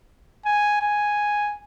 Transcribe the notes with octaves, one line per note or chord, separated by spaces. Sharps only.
G#5
G#5